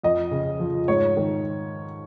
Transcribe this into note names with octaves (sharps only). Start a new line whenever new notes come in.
F2 D#5
C#3
F3
G#2 C#5
D#3